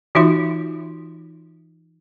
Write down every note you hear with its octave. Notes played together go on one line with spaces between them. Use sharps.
E3 D#4 F4 F#4 E5 C6